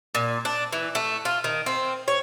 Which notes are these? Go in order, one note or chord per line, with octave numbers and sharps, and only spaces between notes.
A#2
D4
E3
A3
F4
D#3
C4
C#5